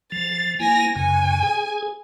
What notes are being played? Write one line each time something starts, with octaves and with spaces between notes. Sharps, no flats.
F3 A6
A#3 E4 G#5 A#6
F#2 C#3 G#5
G#4